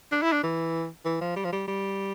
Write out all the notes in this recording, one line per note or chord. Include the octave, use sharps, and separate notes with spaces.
D4
E4
D4
E3
E3
F3
G3
F3
G3
G3